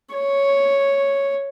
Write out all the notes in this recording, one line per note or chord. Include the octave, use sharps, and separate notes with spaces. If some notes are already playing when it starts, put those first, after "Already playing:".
C#5